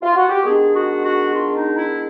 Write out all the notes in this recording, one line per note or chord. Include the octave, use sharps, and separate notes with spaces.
F4
F#4
G4
D#3 G#3 B3 D4 G#4
F#4
F#4
F4
D#4
E4